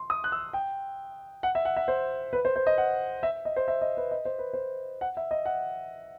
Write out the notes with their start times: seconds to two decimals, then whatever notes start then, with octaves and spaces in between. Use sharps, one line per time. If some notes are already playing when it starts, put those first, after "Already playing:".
Already playing: C6
0.10 D#6
0.24 F#6
0.32 E6
0.53 G5
1.43 F#5
1.55 E5
1.65 F#5
1.76 E5
1.88 C5
2.33 B4
2.45 C5
2.56 C5
2.67 D#5
2.78 F#5
3.23 E5
3.45 D#5
3.56 C5
3.68 E5
3.81 D#5
3.97 B4
4.11 D#5
4.25 C5
4.39 B4
4.53 C5
5.01 F#5
5.17 E5
5.31 D#5
5.45 F#5